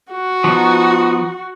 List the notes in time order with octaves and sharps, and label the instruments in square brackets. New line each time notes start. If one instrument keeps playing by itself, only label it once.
[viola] F#4
[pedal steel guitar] F3 B3 D#4